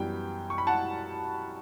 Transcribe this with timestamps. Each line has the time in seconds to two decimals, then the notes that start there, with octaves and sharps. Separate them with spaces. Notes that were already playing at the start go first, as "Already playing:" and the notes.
Already playing: F#2 E3 G3 B3 G5
0.50 C#6
0.58 B5
0.67 F#5 A5